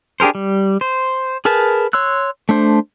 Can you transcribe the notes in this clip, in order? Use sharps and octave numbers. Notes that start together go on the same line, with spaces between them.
D4 G4 G#4 A#4 C5
G3
C5
G#4 A#4 B4 A5
C#5 C6 E6 F#6
A3 D4 C5